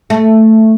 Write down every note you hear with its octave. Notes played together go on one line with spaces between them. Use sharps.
A3